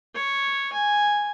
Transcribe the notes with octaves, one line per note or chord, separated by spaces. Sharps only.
C#5
G#5